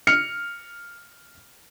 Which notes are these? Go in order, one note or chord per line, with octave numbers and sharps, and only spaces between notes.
F6 C#7